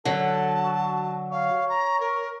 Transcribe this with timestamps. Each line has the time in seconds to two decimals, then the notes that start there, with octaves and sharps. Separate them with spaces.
0.05 D3 F#3 A4 A5
0.64 F#4
1.32 C#5 F5
1.69 A#5
2.00 A#4